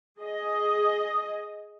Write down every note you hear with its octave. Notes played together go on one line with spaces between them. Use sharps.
G#4 D#5